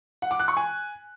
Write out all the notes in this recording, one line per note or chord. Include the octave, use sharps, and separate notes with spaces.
F#5
D6
F#6
C#6
G#5